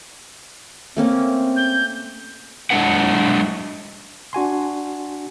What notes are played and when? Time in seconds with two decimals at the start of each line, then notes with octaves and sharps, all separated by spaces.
0.97 A3 A#3 C4 C#4
1.56 G6
2.70 F#3 G#3 A3 D4 B4 F#5
4.33 D4 F#4 G#5 C6